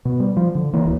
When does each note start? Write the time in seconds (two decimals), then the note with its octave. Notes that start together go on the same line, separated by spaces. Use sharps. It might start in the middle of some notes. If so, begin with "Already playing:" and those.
0.05 B2
0.20 G3
0.37 F3
0.55 D3
0.73 E3 A#3
0.85 D1